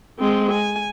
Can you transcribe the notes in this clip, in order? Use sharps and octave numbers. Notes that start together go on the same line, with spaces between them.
G#3 C4
G#5